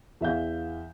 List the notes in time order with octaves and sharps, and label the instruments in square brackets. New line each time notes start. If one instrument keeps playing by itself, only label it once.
[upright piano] E2 E5 F5 G6